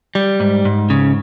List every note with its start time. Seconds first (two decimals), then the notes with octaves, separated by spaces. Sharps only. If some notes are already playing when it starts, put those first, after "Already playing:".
0.15 G3
0.40 G#2
0.65 G#2
0.90 C#3